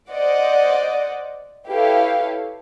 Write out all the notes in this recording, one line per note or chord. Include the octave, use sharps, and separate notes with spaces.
C5 D5 D#5 F#5
E4 G4 A4 B4 C#5 F5